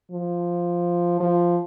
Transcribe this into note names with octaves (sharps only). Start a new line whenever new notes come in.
F3
F3